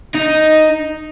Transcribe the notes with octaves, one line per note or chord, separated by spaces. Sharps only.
D#4